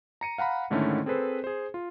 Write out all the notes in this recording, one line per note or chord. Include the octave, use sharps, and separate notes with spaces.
A#5 C#7 D#7
F5 F#5 A#5 B5
G#2 D3 D#3 A3 C#4 E4
C4 G#4 A4 B4 C5
G#4 C5
F4